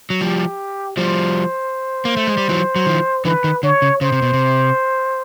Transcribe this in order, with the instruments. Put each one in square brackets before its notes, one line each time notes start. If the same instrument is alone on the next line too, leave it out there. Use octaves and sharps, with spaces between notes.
[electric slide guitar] F#3
[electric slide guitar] F3 G3 [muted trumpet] G4
[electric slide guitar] F3 G3 [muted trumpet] C5
[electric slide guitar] A#3
A3
G#3
G3
E3 F#3
F#3
D#3 F3
[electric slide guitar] D3 E3 [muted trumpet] B4
[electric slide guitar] D#3
[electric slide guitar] D3 [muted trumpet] C#5
[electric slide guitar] C#3
[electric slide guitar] C#3 [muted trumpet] C5
[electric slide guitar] C3
B2
C3